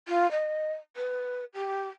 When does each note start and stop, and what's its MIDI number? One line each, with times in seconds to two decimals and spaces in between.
0.08 0.30 65
0.31 0.72 75
0.96 1.44 71
1.54 1.87 67